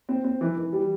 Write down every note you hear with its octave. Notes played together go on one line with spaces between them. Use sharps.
C4
C4
E3
E3
G3